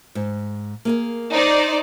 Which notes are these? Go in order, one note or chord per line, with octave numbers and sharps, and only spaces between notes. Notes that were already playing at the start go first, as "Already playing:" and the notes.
G#2
A#3 G#4 A#4
D#4 C5 D5